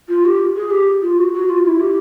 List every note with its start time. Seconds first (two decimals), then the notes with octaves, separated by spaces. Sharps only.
0.09 F4
0.25 G4
0.56 G#4
0.71 G4
1.02 F4
1.18 F#4
1.33 F#4
1.49 F4
1.65 E4
1.80 G4